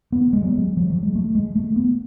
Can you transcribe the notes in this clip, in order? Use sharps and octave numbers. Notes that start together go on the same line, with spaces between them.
B3
G#3
F#3
G#3
F3
F#3
G#3
A3
G#3
A3
B3